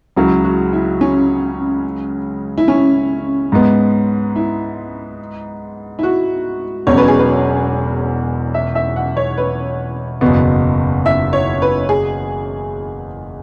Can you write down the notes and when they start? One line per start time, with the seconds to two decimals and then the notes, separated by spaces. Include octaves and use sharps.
0.16 C#2 C#3 F#3 E4
0.44 F#4
0.73 E4
1.01 C#4
2.58 E4
2.68 C#4
3.52 G#2 G#3 B3
4.36 E4
5.99 E4
6.03 F#4
6.87 E1 E2 B2 F#3 C#4 C#5
6.98 B4
7.08 G#4
7.19 B4
8.54 E5
8.75 E5
8.96 F#5
9.17 C#5
9.38 B4
10.21 F#1 E2 B2 B3
11.06 E5
11.33 C#5
11.62 B4
11.89 G#4